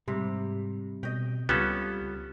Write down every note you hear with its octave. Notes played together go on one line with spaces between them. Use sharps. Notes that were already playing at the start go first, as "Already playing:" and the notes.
G#2 C3 G3
B2 D#5 G5
C#2 G3 B3 C#4 F4 G4 A4